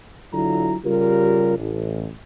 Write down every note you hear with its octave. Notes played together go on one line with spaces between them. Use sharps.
D3 F#3 E4 F4 A#5
C#3 G3 F4 G4 A#4
A1